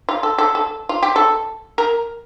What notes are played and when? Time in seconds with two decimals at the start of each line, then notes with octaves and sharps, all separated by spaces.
0.09 F4
0.23 A4
0.38 A4
0.55 A4
0.89 F4
1.03 G4
1.16 A4
1.78 A#4